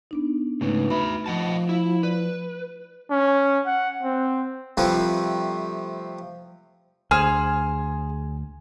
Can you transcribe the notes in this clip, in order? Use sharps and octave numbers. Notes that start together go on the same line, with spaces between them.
B3 D4 D#4
G#2 C#3 A3 D#4 B4
F#4 E5 B5
F3 D#5 F#5 A5
E4
B4 D5
C#4
F#5
C4
C3 F3 G3 A3 A4 B4
D2 G#4 C5 G#5 F6